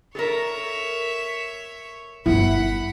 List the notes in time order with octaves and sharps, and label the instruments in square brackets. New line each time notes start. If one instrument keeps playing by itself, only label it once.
[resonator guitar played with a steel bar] A4 A#4 [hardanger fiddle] C#5 E5
[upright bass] G1 [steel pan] E4 [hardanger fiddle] F#5 B5